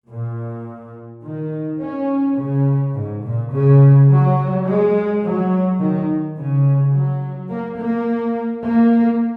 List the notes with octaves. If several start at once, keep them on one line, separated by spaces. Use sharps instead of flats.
A#2
D#3
C#4
C#3
G#2
A#2
C#3
F#3
G#3
F#3
D#3
C#3
F#3
A#3
A#3
A#3